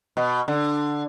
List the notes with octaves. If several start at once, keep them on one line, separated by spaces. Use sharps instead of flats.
B2
D3